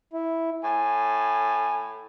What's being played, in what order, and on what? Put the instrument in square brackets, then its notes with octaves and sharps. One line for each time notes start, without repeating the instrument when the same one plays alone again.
[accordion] E4
[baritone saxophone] A2 [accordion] G#5